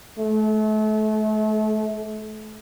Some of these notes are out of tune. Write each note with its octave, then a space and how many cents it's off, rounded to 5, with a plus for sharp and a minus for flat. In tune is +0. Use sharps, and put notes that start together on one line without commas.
A3 -35